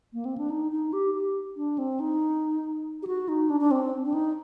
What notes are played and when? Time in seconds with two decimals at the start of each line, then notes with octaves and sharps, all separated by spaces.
0.13 A#3
0.25 C4
0.38 D4
0.50 D#4
0.72 D#4
0.93 G4
1.15 G4
1.57 D4
1.78 C4
2.00 D#4
3.03 G4
3.07 F#4
3.28 D#4
3.50 D4
3.61 D4
3.71 C4
4.05 D4
4.14 D#4